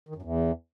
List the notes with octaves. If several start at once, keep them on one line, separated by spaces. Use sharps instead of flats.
D#3
F#2
E2